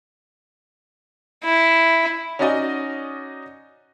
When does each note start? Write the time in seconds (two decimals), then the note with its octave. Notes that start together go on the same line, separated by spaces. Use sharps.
1.44 E4
2.39 C#4 D#4 F#4 D5 D#5 G#5